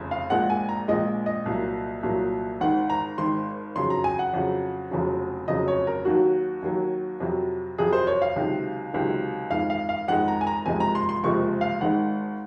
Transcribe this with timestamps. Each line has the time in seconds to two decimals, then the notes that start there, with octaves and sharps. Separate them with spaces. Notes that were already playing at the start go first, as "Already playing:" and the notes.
Already playing: F1 F2 C#3
0.11 F5
0.30 A#1 A#2 G#3 F#5
0.50 G#5
0.69 A#5
0.88 A#1 A#2 G#3 D#5
1.26 D#5
1.46 C2 A#2 F#3
2.03 C2 A#2 F#3
2.61 G#1 G#2 D#3 F#5
2.90 A#5
3.18 G#1 G#2 D#3 C6
3.75 F2 C#3 F#3 C6
3.90 A#5
4.04 G#5
4.19 F#5
4.34 F2 C#3 F#3
4.91 F1 F2 C#3 F#3
5.48 F1 F2 C#3 F#3 D#5
5.68 C#5
5.87 A#4
6.05 D#2 D#3 F#3 F#4
6.63 D#2 D#3 F#3
7.20 F2 C3 F#3
7.78 F2 C3 F#3 G#4
7.93 C5
8.07 C#5
8.22 F5
8.36 C#2 C3 D#3 F#3
8.93 C#2 C3 D#3 F#3
9.50 F2 D#3 G#3 F5
9.70 F5
9.89 F5
10.08 F2 D#3 G#3 F#5
10.28 A#5
10.41 G#5
10.47 A#5
10.66 F#1 F2 C3 F3 G#3 G#5
10.80 A#5
10.95 C6
11.09 C6
11.24 F#1 F2 C3 F3 G#3 C#6
11.61 F5
11.81 G#1 G#2 D#3 G#3 F#5